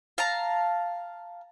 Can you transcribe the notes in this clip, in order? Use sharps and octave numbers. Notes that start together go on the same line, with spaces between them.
F5 A5 A#5